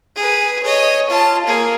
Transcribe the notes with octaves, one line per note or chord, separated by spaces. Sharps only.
G#4 B4
C#5 D#5
F4 A5
A#3 G#4